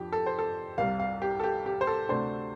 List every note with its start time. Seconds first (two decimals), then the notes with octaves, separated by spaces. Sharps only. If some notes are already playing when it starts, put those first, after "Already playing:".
Already playing: F2 F3 D4 G4
0.12 A4
0.26 C5
0.39 A4
0.78 C2 C3 G3 F5
1.00 F5
1.22 G4
1.40 A4
1.44 G4
1.66 G4
1.81 C5
1.87 A4
2.09 D2 C3 A3 D4 C5